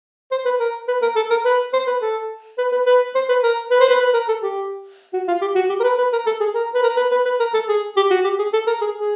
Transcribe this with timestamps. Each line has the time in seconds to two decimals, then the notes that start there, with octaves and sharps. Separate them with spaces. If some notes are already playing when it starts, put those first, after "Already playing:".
0.31 C5
0.45 B4
0.60 A#4
0.88 B4
1.02 A#4
1.16 A4
1.30 A#4
1.45 B4
1.73 C5
1.87 B4
2.01 A4
2.58 B4
2.72 B4
2.86 B4
3.15 C5
3.29 B4
3.43 A#4
3.71 B4
3.81 C5
3.89 B4
4.00 B4
4.14 A#4
4.28 A4
4.42 G4
5.13 F#4
5.28 F4
5.41 G4
5.55 F#4
5.69 G4
5.80 A#4
5.83 B4
5.98 B4
6.12 A#4
6.26 A4
6.40 G#4
6.54 A#4
6.74 B4
6.83 A#4
6.97 B4
7.11 B4
7.25 B4
7.40 A#4
7.54 A4
7.68 G#4
7.97 G4
8.10 F#4
8.24 G4
8.39 G#4
8.53 A4
8.67 A#4
8.81 G#4
8.95 G#4